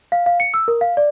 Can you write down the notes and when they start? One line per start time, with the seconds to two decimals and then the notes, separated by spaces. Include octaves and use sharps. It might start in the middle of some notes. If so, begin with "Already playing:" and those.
0.12 F5
0.26 F5
0.40 C#7
0.54 E6
0.68 A#4
0.81 F5
0.97 D5